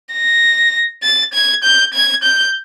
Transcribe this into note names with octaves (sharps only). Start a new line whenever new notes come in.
A#6
A6
G#6
G6
G#6
G6